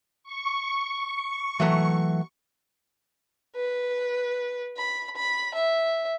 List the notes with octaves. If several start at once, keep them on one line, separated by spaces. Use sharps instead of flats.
C#6
E3 F#3 A3
B4
B5
B5
E5